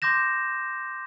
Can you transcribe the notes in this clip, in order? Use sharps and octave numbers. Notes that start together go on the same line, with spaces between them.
C6 D6 G6 A#6 E7